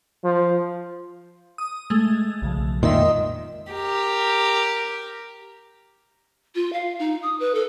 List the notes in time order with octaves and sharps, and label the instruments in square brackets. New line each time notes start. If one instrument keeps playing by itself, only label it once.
[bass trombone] F3
[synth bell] D#6
G#3 A3
[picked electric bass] B1 C#3 F3
[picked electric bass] F2 G#3 [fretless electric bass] A#2 D#3 [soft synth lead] D#5 [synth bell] E5 C6
[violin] G4 A#4
[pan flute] F4
F5
D#4
D#6
B4
A4